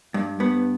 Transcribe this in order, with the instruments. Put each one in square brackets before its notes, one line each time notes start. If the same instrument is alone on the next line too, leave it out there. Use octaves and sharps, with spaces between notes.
[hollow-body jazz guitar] G2
G2 B3